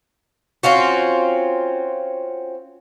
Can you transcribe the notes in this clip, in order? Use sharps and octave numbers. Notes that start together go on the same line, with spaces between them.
C4 C#4 F4 F#4